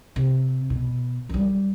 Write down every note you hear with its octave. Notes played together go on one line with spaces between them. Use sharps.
C3
B2
F#2 G3